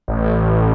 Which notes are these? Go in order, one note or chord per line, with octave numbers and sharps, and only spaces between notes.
A1